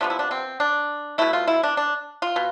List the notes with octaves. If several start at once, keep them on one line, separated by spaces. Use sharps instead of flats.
C3 F3 B3 D4
E4
D4
C4
D4
B2 A3 E4
F4
E4
D4
D4
F4
B2